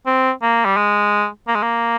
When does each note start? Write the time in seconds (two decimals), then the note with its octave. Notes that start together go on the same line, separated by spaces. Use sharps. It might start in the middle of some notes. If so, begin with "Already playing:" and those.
0.06 C4
0.42 A#3
0.65 G3
0.77 G#3
1.47 A#3
1.55 G#3
1.63 A#3